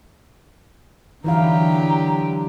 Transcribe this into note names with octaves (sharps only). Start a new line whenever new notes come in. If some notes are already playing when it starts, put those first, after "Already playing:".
D3 E3 F#3 E4 G4 F5 A#5